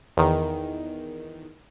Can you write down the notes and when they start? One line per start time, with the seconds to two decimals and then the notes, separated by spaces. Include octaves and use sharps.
0.17 E2 D#3